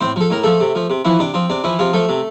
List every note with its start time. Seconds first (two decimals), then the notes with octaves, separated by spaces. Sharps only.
0.01 A2 C4 C5
0.16 F3 A4
0.30 A2 A#4
0.44 F3 A3 A4
0.60 C3
0.75 F3
0.90 C3
1.05 E3 F3 E4
1.19 C3 D4
1.34 F3 C4
1.50 C3 D4
1.64 E3 F3 E4
1.79 C3 F3 F4
1.93 F3 A3 A4
2.09 C3